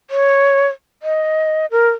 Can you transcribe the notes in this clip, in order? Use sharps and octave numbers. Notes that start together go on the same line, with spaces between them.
C#5
D#5
A#4